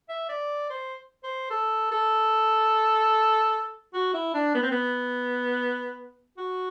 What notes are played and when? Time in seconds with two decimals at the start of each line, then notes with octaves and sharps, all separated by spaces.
0.09 E5
0.29 D5
0.70 C5
1.23 C5
1.50 A4
1.92 A4
3.94 F#4
4.14 E4
4.34 D4
4.55 B3
4.63 C4
4.71 B3
6.37 F#4